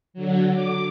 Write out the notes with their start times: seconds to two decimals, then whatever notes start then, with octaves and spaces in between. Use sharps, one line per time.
0.14 D3 F#3
0.52 D6